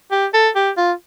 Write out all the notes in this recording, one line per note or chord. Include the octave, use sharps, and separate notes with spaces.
G4
A4
G4
F4